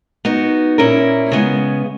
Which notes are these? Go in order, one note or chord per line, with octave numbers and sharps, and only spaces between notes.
B3 D#4 F#4
A#2 A#3 C#4 E4 A#4
C#3 G#3 B3